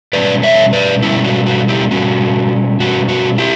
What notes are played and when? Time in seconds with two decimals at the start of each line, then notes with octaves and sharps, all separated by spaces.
0.13 B2 G3 C#4 B4 D5
0.43 C#5 E5
0.73 B4 D5
1.02 B2 G3 C#4 E4
1.24 F#4
1.46 F#4
1.68 E4 G4
1.91 B2 G3 C#4 F#4
2.80 B2 G3 C#4 F#4
3.09 F#4
3.38 E4 G4